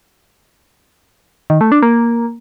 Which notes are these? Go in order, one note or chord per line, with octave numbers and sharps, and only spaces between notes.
D#3
A3
D4
A#3